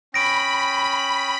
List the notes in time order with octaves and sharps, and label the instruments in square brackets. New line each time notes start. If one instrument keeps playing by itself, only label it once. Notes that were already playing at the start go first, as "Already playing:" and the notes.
[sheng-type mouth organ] C#4 G5 D#6 [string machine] B5 [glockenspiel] A#6 D7